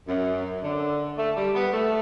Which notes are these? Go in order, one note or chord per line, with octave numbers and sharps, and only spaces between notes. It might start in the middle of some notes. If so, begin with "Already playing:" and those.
F#2
D3
A3
G3
B3
A3